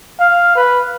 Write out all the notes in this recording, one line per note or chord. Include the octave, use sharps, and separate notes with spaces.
F5
B4